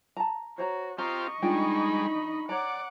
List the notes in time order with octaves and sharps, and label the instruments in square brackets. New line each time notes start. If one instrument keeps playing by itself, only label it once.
[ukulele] A5 A#5
[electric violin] F#4 [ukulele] C5 C#5 A#5
[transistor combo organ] C4 F4 G4 [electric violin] D#5 C#6 [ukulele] A#5
[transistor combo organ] G3 G#3 [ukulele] D4 F4 G5 [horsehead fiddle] D#4 B5
[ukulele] C#5 A#5 [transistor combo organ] D5 [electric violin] F#5 D6